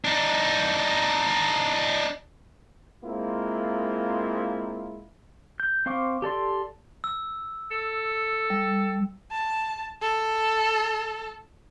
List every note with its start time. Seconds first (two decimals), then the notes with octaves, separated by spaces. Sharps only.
0.05 D4 D#4
3.04 G#3 A#3 C4 E4 F4
5.60 G6
5.86 C4 C5 F5 C#6 D6
6.22 G4 A4 D5 C6
7.04 E6
7.71 A4
8.50 G3
9.31 A5
10.02 A4